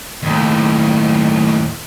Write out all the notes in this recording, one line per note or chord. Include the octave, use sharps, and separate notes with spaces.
D#2 A2